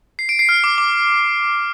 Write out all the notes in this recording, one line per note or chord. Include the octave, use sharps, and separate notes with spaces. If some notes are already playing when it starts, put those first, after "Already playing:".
C7
D7
C7
F6
D6
D6